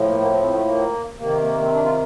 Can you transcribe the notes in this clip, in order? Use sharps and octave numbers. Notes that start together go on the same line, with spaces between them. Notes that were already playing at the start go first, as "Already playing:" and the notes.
Already playing: A2 F3
A#3
A#3
C4
C4
A3
A#3
C3 D#3 A#3
A#3
C4
D4
F4